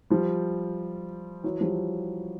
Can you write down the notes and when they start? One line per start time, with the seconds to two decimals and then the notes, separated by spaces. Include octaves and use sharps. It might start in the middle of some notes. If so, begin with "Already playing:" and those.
0.10 F3 G3
1.44 E3 F#3
1.60 F3 G3